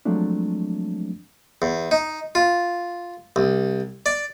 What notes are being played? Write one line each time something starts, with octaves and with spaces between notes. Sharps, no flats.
F3 F#3 G#3 A3 C4 D4
E2
D#4
F4
C2
D5